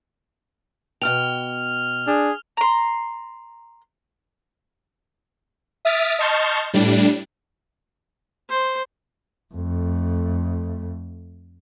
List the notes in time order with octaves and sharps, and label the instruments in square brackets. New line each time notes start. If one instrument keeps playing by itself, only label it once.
[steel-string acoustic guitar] B2 G5 [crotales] F6 F7
[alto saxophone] D4 [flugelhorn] G#4
[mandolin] A#5 C6
[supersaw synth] E5 D#6 F6 A6 B6 D7
D#5 A5 C6 C#6 F6 G6
A2 G3 D4
[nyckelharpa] C5
[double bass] F2 A3